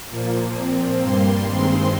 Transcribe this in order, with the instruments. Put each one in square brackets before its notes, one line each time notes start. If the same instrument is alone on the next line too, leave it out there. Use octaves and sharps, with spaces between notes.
[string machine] A#2 F3 A#3
A#2 F3 C4
G2 G3 A#3 C6
G2 D#3 G#3 C4 C6